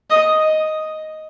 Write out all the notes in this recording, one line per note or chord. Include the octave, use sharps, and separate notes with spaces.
D#5